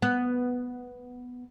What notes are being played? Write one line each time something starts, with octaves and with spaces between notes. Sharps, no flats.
B3